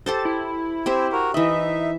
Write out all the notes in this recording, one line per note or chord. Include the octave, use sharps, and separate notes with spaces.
G4 A4 C5 A6
E4
C4 G4 C5 E5
F#4 A#4
E3 D#4 D#5 E5